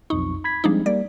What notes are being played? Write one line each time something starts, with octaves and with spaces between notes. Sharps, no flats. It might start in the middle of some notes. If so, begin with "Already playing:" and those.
B1 F2 D#4 C#6
B5 G#6 B6
F3 G3 G#3 C4 D4 D#4
G3 A#3 D5